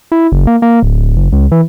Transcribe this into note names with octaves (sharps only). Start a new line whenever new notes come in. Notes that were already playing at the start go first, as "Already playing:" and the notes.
E4
F#1
A#3
A#3
D1
F#1
C#2
E3